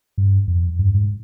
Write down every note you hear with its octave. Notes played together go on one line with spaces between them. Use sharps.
G2
F2
G2
G#2